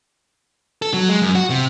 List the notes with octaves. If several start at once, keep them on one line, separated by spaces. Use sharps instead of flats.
A4
F#3
G#3
F#2
F#4
C3